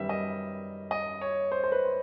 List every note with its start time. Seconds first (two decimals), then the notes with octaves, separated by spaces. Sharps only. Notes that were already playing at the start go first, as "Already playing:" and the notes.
Already playing: F#2 D#3 G3 B3 E5
0.09 D#5
0.91 D#5
1.21 C#5
1.52 C5
1.64 C5
1.72 B4